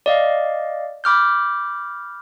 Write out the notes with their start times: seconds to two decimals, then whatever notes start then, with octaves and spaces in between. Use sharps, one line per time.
0.06 D5 D#5 F5
1.04 B5 D6 F6 G6